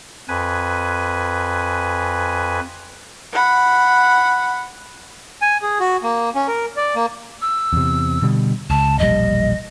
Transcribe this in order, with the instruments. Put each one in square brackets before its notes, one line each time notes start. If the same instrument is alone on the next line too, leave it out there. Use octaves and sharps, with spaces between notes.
[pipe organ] F2 B4 G#5
[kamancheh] F#5 B5
[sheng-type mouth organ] G#5
G#4
F#4
A#3
C#4
A#4
D5
A#3
[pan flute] E6
[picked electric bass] E2 C3
B2 D3 G3
[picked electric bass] C#2 [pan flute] A5
[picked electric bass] E1 A#1 G3 [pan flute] D#5